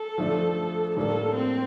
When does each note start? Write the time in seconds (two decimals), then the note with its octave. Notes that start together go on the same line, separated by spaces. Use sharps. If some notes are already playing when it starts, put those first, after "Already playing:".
Already playing: A4
0.18 F3 A3 D4
0.97 A2 G3 A#3 D4 A4
1.35 C4